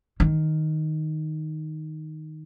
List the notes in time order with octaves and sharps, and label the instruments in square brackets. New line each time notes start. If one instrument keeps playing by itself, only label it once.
[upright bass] D#3